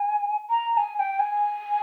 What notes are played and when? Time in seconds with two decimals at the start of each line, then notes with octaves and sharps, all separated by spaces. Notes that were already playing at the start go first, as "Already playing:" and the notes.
Already playing: G#5
0.49 A#5
0.73 A#5
0.77 G#5
0.96 G#5
0.99 G5
1.19 G#5